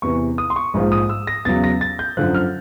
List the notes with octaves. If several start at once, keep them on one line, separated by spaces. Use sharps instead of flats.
E2 C3 E3 C#6
D#6
C6
C#6
A#1 G#2 F3 G#3
D#6
E6
A#6
E2 C#3 F#3 A6
A#6
A6
G6
F#2 D3 F3 F#6
F6